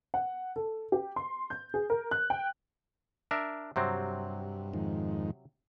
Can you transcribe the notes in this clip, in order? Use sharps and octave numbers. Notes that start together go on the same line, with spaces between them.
F#5
A4
G4
C6
G6
G#4
A#4
F#6
G5
D4 A#4 E5
G2 C3 F#3 C4
F2 G#2 D#3